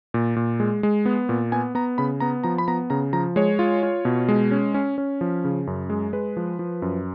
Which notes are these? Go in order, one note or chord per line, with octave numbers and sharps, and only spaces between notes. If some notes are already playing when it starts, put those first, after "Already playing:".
A#2
A#2
G#3
G#3
B3
A#2
B3 G#5
B3 A#5
C#3 B5
B3 A#5
F3 A#5
B5
B3 A#5
C#3 A#5
F3 A#5
G#3 C#5
F4
F4
B2
G#3
C#4
C#4
C#4
F3
C#3
F#2
G#3
G#3 B4
F3
F3
F#2